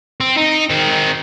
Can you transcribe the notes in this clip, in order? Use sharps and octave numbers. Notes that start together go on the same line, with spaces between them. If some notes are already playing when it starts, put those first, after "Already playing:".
C4
D#4
D#3 C4